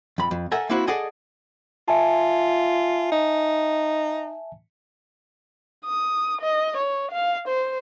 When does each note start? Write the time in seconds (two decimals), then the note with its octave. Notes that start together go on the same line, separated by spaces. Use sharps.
0.18 F2 B5
0.31 F2
0.52 A4 A#4 E5 F#5 G#5
0.69 A#3 C4 E4 F#4 C5
0.87 G#4 A4 D5 D#5 F#5 G#5
1.88 F4 E5 G#5 A5
3.12 D#4
5.86 D#6
6.42 D#5
6.77 C#5
7.12 F5
7.48 C5